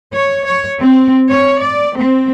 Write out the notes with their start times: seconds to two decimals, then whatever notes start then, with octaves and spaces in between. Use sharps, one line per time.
0.14 C#5
0.45 C#5
0.80 C4
1.29 C#5
1.61 D5
1.96 C4